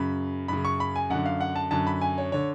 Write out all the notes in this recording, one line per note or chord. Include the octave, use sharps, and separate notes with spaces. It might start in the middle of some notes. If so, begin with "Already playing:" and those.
Already playing: F#2 C#3 B5
F#2 C#3 B5
C#6
B5
G#5
F#2 D3 F#5
F5
F#5
A5
F#2 D3 A5
B5
G#5
C#5
D3 C#5